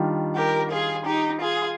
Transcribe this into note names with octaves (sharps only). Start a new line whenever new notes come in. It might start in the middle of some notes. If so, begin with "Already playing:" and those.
Already playing: D#3 G3 D4 F4
G4 A#4
F4 G#4
D#4 G4
F4 G#4